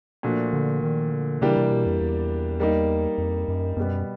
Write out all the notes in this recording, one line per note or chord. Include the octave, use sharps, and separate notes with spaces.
A#2 F3 A3 D4 F#4
D3
D#3
D3
C#3 E3 G3 A#3 D4 G4
C3
B2
F2
E2
G3 A#3 D#4
F2
F#2
F#2 B2 G3 B3